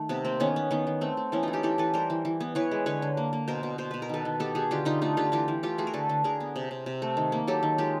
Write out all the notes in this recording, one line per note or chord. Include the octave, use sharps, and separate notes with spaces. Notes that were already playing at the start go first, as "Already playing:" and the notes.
Already playing: D#3 A3
C3 B3
A#3 C4
D#3 B3 C#4
B3
D#3 B3
D#3
A3 C4
A3
E3 B3 C#4
A3 D#4 F4
F4 G4
E3 G4 A4
E3 A4 B4
G3 A#4 C5
E3
E3
B3
E3 B4 C#5
G#3
D3 B4 C#5
D3
A#3
A#3
B2 A#4 C5
B2
B2 C5
B2 B4
A#4
D#3 A4 B4
D#3
B3 G4 A4
B3 F#4 G#4
D3 F4 G4
D3 D#4 F4
A3 D#4 F4
D3 F4 G4
E3 F4 G4
E3
A3 F4 G4
A3 F#4 G#4
A#4
D3 A4 B4
D3
D3 G#4 A#4
B3
C3
C3
C3
A3
D#3
A#3
F#3 G4 A4
D#3
G#3 F4 G4